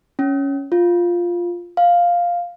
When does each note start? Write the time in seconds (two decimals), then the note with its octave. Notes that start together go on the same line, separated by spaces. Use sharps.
0.19 C#4
0.72 F4
1.77 F5